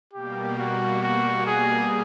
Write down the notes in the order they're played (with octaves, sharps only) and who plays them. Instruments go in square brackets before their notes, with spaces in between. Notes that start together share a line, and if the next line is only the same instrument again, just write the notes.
[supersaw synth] B2 G3 A#3 [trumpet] G4
[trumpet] F#4
F#4
G#4